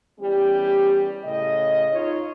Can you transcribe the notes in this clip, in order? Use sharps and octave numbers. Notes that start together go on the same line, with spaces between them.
E2 G3 C#4 G4
A2 C#3 D#5
D#4 F4 C#5 D#5